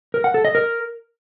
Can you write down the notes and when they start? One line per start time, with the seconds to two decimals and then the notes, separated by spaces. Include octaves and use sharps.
0.14 A#4
0.24 F#5
0.34 A4
0.45 D#5
0.55 A#4